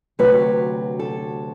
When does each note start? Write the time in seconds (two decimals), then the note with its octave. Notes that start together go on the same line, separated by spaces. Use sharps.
0.19 D2 C3 F#3 B4
0.99 A4